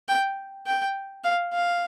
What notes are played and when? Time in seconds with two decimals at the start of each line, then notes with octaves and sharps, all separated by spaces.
0.08 G5
0.67 G5
1.24 F5
1.53 F5